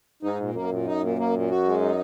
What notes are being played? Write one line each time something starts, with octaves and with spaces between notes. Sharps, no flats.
G#2 D#4
A#2
F#2 A#3
A#2
D#4
A#2
A#3
A#2
F#4
G#3
D#4